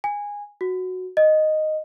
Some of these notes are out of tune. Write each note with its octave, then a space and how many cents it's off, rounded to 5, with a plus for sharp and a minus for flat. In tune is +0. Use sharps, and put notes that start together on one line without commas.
G#5 -15
F#4 -5
D#5 -5